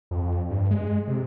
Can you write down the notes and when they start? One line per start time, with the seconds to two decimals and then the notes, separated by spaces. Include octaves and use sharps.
0.11 F2
0.50 G2
0.71 G#3
1.08 C3